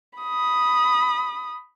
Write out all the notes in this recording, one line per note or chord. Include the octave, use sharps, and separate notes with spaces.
B5 D#6